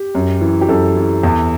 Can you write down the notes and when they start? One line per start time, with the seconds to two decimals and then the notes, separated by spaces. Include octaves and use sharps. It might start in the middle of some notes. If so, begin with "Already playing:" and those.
Already playing: G4
0.15 F#2
0.41 E3
0.61 G4
0.68 F#2 A4
0.96 E3
1.23 E2